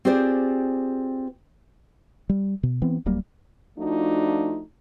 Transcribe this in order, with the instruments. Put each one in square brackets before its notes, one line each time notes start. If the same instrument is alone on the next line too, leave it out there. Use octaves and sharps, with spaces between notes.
[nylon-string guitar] C4 F4 G4 G#4 C5 D5
[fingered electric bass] G3
B2
E3 B3 C4
D1 F#3 G3 A#3
[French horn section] F3 A3 D4 D#4 F4 F#4